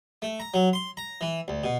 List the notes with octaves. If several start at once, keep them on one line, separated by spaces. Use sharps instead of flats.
A3
A#5
F#3
C6
A#5
E3
D2
B2